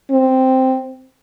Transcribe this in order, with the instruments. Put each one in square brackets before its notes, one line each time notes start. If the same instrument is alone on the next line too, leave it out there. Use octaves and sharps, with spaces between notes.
[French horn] C4